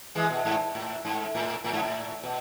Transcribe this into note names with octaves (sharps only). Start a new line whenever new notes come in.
E3 G#3
B2
G#2
A2
G#2
A2
A2
G#2
A2
B2